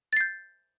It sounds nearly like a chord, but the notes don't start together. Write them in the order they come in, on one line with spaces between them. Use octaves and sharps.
A6 C7 G6